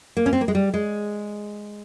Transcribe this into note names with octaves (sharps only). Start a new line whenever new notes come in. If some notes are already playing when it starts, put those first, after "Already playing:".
A#3
C#4
C4
A#3
G#3
G3
G#3